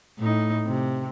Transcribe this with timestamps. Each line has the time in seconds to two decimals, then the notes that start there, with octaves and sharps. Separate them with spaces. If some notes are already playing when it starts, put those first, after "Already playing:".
0.19 A2 D#4
0.66 C3